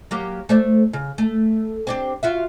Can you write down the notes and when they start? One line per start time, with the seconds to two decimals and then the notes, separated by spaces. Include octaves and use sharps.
0.11 F#3 A#3 G4
0.49 A3 C5 D5
0.93 C#3
1.18 A3
1.87 C4 D4 G4
2.23 F4 F#4 E5